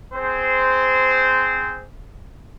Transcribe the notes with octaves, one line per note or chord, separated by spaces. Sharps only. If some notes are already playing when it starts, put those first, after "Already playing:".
C4 G#4 C5